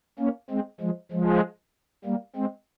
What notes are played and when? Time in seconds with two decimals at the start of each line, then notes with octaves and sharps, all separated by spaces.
0.19 A#3 C#4
0.50 G#3 C4
0.81 F3 G#3
1.12 F3 G#3
2.05 G3 A#3
2.36 G#3 C4